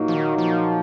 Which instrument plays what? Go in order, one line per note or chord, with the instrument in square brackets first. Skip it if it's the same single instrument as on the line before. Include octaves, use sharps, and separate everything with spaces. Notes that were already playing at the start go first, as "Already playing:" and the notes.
Already playing: [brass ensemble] A#2 F#3 A#3 D#4
[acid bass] F3
D#3
F3